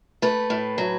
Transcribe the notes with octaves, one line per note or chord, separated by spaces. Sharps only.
A3 B4
A2
F#3